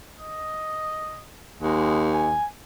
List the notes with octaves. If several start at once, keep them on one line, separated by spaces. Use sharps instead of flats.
D#5
D#2 G#3
G#5